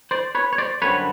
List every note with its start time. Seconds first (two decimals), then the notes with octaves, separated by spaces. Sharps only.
0.11 C5 D5
0.35 B4 C#5
0.53 C#5
0.58 C5 D5
0.82 F#2 D3 G3 C4 B4 C#5